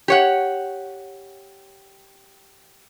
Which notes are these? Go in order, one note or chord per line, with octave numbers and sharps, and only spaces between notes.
G4 C#5 F#5